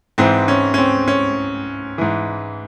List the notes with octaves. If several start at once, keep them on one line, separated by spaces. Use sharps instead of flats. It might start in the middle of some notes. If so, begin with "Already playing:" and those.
G#2 E3 C4
C#4
C#4
C4
C#4
G#2 E3